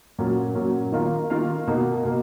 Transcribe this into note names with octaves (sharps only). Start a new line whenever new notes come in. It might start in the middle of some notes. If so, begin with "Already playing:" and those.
A#2 F#3 A#3 C#4
A#2 F#3 A#3 C#4
D#3 A#3 F4 A#4 F5
D#3 A#3 F4 A#4 F5
B2 A#3 D#4
B2 A#3